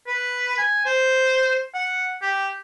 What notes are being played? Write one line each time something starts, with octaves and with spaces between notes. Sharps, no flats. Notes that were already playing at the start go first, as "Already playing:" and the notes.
B4
G#5
C5
F#5
G4